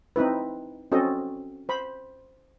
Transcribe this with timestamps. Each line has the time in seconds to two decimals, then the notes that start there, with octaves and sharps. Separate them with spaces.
0.16 C4 D#4 E4 B4
0.92 C4 C#4 F#4 A4 D#5
1.69 C5 B5